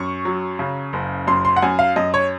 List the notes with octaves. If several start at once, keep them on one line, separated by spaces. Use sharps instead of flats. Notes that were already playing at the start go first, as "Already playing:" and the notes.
Already playing: F#2 C#6
F#3
C#3
F#1
F#2 C6
C6
F#5
F#2 G#5
F5
F#2 D#5
C#5